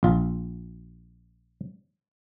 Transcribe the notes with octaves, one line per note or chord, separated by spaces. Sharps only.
A#1 F4